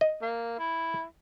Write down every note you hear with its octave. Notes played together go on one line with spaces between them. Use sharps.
D#5
A#3
E4